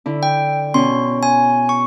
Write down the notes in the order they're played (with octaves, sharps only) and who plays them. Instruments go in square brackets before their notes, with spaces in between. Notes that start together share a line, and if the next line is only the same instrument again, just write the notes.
[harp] D3 E4
[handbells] G5
[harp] B2 C#4 [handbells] C6
[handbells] G#5
C#6